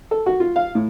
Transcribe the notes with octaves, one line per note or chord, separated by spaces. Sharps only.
A4
F#4
F4
F5
A2